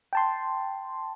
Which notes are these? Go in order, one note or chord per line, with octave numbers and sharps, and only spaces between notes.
G5 A5 C6